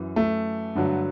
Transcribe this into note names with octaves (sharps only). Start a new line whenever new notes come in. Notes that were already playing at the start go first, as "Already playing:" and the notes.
Already playing: F#2 E3
A3
G2 D3 F#3